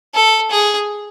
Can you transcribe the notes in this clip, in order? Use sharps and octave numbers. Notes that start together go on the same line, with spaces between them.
A4
G#4